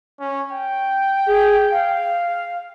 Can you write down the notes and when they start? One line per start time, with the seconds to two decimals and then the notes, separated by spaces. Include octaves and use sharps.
0.20 C#4
0.52 G5
1.27 G#4
1.72 F5